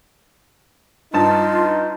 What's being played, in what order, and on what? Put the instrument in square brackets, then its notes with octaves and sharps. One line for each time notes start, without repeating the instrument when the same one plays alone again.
[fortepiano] G2 A5 [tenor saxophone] D#4 [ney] F4